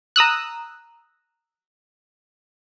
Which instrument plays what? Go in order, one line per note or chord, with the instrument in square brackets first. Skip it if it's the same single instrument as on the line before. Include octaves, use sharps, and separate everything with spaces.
[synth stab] A#5 D#6 E6 F#6